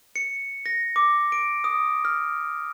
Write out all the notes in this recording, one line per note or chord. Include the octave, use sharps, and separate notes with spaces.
C#7
A#6
D6
D7
D#6
F6